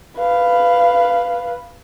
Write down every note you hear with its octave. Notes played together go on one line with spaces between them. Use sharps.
B4 F5